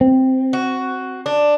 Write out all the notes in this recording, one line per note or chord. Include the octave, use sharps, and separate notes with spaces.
C4
F#4
D4